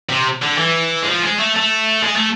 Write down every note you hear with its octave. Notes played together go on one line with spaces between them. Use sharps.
C3
D3
E3
G#3
F3
G#3
A3
A3
G#3
A3